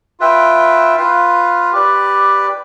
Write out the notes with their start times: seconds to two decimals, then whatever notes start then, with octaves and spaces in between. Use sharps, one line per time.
0.20 F4 B4 E5 G5
0.97 F4 B4 F5
1.72 G4 B4 D5